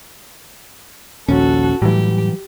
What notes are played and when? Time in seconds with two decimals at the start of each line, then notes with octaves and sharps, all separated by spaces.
1.29 D#1 A#1 D#2 C#4 F#4 A4
1.82 A2 E3 F#3 G3 G4